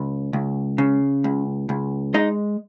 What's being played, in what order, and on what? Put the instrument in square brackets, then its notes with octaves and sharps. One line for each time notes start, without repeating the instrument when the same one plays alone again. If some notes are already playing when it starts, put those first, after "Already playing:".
Already playing: [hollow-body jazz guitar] C#2
C#2
C#3
C#2
C#2
G#3 D#4 D#5